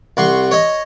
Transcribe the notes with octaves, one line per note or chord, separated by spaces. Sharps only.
C2 F#5 C6 C#6
C#5 D#5